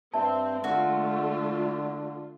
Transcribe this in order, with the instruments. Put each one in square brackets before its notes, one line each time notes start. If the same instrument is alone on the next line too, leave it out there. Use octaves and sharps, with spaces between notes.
[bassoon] G2 [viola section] C4 [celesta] E5 A5
[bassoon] D3 [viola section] A3 F4 [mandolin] F#4